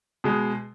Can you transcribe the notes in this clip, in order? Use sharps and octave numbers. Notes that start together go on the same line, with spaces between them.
B2 G#3